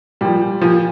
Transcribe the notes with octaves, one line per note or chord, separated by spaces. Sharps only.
A#2 F3 G3
A#2 F3